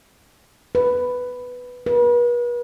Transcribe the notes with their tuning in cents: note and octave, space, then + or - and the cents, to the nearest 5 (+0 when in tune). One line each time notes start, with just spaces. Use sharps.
B4 +5
B4 -40